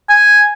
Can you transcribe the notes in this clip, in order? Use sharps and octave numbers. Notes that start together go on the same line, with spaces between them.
G#5